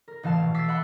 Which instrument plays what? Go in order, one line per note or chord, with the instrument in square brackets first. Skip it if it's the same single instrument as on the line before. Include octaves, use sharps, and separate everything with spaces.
[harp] A#4
A1 E3 F5 A5 E7
B2
D6 E6 A6 B6 C7
E5 F#5 B5 C6